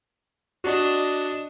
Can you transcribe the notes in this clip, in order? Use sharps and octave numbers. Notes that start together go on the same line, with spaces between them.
D4 F#4 D5 D#5